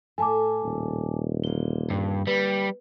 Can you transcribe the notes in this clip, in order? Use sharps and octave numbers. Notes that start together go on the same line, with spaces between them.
A2 A4 E5 G#5 A5 D6
D#1
D3 A#3 G7
G2
G3 B4